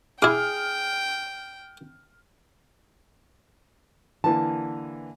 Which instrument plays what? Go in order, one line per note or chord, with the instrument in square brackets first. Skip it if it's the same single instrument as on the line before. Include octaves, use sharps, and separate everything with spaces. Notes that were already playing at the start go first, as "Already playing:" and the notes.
[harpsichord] E4 D6 [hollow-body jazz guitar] G#4 [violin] G5 [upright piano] F6
[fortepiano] D3 E3 A#3 [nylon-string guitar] A5